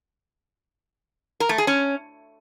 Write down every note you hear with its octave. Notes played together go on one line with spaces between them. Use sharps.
A#4
A3
G#4
C#4